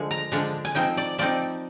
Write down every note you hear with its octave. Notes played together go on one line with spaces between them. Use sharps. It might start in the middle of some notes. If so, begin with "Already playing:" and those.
Already playing: D3 F3 G#3
A#5
D3 F3 G#3 D4
G#5
F3 C4 D#4 G5
D5
F3 C4 D#4 D5